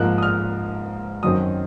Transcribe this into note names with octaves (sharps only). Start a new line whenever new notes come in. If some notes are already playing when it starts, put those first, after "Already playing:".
Already playing: G#2 F3 A#3 F#6
D#6
F6
F#2 D#3 F#3 C4 D#6